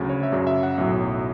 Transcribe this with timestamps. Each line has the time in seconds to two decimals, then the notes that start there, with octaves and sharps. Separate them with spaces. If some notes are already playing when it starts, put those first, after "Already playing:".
Already playing: D2 C#3 F#3
0.09 C#5
0.23 E5
0.32 F#2 C#3 F#3 D5
0.47 E5
0.63 F#5
0.78 B1 A2 F#3 E5